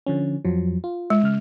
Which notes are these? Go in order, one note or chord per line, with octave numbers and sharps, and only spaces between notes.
D3 F3 C#4
F2 F3 F#3
F4
G#3
C#3 F6